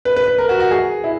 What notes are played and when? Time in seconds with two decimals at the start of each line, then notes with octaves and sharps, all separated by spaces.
0.05 B4
0.16 B4
0.27 B4
0.38 A#4
0.49 F#4
0.60 F#4
0.71 G#4
1.04 E4